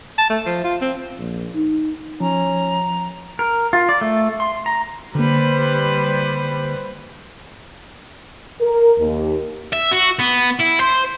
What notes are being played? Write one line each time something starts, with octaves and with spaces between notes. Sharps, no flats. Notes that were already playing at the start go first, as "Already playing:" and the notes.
A5
A3
F3
F4
C4
A#1
D#4
F3 C#4 A#5
A#4
F4
D5
A3
C6
A#5
D3 G3 A#3 B4 C5
A#4
D#2
E5
F#4
B3
E4
C5